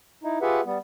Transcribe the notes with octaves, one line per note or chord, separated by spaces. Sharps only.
D#4 E4
F4 G4 G#4 B4 E5 F#5
G3 B3